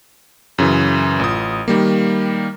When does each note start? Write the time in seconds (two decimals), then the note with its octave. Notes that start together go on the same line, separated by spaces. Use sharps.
0.58 F#2 C#3 E3
1.20 A1 F4 D#6
1.68 D#3 G3 A#3